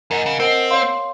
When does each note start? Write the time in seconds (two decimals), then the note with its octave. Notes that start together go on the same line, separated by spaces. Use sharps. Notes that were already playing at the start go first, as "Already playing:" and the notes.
0.11 F#2 A#4 D#5 F#5
0.26 C#3
0.40 C4 A#4 D#5 F#5
0.71 C#5 F5 C6